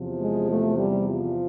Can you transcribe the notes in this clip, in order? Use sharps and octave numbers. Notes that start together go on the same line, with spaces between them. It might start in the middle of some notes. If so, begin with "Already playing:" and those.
Already playing: E2 C3 F3
G#3
A3
G3
F3